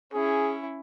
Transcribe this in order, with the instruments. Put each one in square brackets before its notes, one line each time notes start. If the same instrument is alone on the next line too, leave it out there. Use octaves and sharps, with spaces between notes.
[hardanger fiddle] C#4 E4 [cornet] G#4